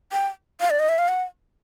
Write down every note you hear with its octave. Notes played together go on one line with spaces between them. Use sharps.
G5
F5
D5
D#5
E5
F5
F#5